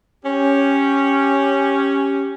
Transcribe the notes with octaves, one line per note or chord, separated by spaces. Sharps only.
C#4 G4